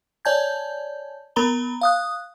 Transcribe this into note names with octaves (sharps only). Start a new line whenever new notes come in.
C#5 D5 G#5 A5 G6 G#6
B3 A#4 A#5 B5 G7
F5 D#6 F#6